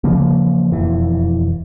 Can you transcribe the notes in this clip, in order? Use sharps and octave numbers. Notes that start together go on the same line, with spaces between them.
C#3 E3 F3 A#3
E1 F2 E3